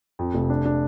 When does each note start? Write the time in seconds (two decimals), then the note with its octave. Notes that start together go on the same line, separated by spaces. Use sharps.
0.19 F2
0.34 F1
0.50 D4
0.65 D4